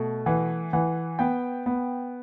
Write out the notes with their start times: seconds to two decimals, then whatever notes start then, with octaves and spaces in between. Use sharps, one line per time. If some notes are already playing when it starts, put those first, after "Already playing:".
Already playing: B2 A3
0.26 E3 F#5
0.73 E3 F#5
1.19 B3 G5
1.66 B3